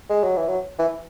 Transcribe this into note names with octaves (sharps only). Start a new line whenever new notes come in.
G#3
F#3
E3
F#3
E3